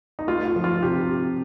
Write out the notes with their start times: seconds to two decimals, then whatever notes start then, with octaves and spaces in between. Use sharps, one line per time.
0.19 D#4
0.27 A3 F4
0.46 F4
0.56 F3
0.64 F4
0.83 C3 G4